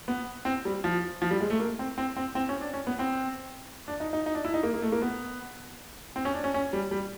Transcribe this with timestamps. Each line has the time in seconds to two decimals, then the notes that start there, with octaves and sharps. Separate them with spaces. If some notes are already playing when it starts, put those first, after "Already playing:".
0.08 B3
0.45 C4
0.65 G3
0.84 F3
1.22 F3
1.31 G3
1.41 G#3
1.50 A3
1.59 A#3
1.79 C4
1.98 C4
2.16 C4
2.35 C4
2.49 C#4
2.61 D4
2.74 C#4
2.87 B3
2.99 C4
3.88 D4
4.00 D#4
4.13 D#4
4.26 D#4
4.35 D4
4.45 E4
4.54 D#4
4.63 A#3
4.74 A#3
4.82 A3
4.92 A#3
5.02 B3
6.16 C4
6.25 C#4
6.34 D4
6.44 C#4
6.54 C#4
6.73 G3
6.91 G3